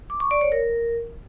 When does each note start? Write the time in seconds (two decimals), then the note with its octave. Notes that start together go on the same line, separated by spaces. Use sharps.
0.10 D6
0.20 C#6
0.31 D5
0.41 C#5
0.52 A#4